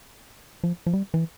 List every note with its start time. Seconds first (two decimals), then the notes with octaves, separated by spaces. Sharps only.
0.64 F3
0.87 F3
0.93 G3
1.14 E3